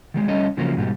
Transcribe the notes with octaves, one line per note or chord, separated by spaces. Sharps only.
D#3 G3 G#3
G3 A3 C#4 A4 D#5
C#3 F3 F#3 A3 A#3
G#2 B2 G3